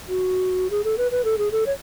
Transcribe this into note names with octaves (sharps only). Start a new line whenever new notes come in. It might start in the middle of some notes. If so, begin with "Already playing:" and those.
F#4
G#4
A4
B4
B4
A4
G#4
A4
C#5